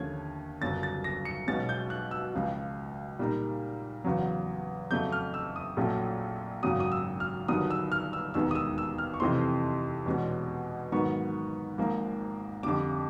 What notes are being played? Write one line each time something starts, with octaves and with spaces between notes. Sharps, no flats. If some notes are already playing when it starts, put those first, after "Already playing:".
Already playing: D#2 D3 F3 A3 C#4 G#6
G1 F#2 C#3 A6
A6
A#6
C#7
B1 B2 G#3 C#4 A6
G6
F#6
E6
C#2 C#3 F3
A#2 G3 A#3 D#4
E2 C#3 F#3
F2 C#3 F#3 A3 G6
F6
E6
D#6
A#1 A#2 F#3 A3 C#4
G#1 F#2 C#3 F#3 D#6
D#6
E6
F6
G1 G2 D#3 F#3 D#6
E6
F6
E6
E1 D#2 D#3 G#3 B3 E6
D#6
E6
E6
F6
C#6
F2 C3 E3 A3 C4 C6
E2 B2 G#3 C#4
G#2 D#3 F#3 B3 C#6
G#1 G#2 F3 A#3
F2 D3 G3 D6